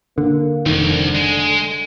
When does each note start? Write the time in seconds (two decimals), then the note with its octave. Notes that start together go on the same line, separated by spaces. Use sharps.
0.18 D3 A#3
0.66 F1 C2 D3 D#3
1.15 G#3